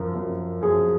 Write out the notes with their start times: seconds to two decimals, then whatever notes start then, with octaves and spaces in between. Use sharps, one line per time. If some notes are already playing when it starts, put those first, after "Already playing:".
Already playing: F#2 F3 A#4
0.14 F#2 F3
0.62 F#2 F3 G#4